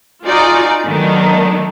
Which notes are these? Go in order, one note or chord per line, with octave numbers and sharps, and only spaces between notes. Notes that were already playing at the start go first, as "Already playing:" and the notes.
D#4 F4 F#4 G#4 D5
D#3 F#3 A3 B3 D4 D#4